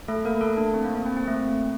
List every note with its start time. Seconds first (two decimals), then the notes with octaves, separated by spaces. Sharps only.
0.08 A3 A4
0.25 A#3 A#4
0.41 A3 A4
0.57 D4
0.74 C4
0.85 A#3
0.95 A#3
1.06 C4
1.17 C4
1.28 A3